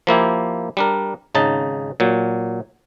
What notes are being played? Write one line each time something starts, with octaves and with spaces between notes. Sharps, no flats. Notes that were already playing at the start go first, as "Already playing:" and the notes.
F3 A#3 E4 G4
G3 D4 A#4
G#1 C#3 D#4 A5
A#2 F#3